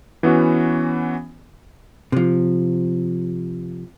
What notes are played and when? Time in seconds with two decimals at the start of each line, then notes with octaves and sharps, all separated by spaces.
0.23 E3 B3 C#4 F#4
2.12 C3 F3